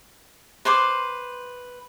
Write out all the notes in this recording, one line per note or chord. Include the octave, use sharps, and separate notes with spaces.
B4 C5 C6 D6